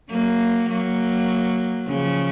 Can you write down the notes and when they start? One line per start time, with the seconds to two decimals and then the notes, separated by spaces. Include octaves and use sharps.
0.10 F#3 A#3
0.69 F#3 A#3
1.87 C#3 F3